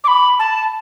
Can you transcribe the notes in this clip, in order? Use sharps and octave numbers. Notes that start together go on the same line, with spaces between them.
D6
B5
A5